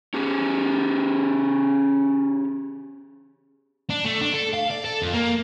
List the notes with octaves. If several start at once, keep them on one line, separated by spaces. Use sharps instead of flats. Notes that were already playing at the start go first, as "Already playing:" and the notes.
C#4 G4 G#4
D4
A3
D4
A4
F5
D5
A4
F2
A#3